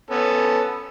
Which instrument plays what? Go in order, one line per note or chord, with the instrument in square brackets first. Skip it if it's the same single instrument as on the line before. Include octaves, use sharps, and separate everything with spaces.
[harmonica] B3 C#4 A4